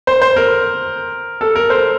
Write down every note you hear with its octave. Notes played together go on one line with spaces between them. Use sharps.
C5
C5
A#4
A4
A#4
C5